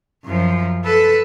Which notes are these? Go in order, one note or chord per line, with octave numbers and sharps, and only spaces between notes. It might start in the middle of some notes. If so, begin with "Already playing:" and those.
F#2 F3
A4 B4